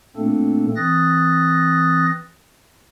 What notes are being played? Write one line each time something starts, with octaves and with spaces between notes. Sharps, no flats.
A#2 A3 A#3 C4 D4 A4
E3 C4 D#6 F#6 A6 A#6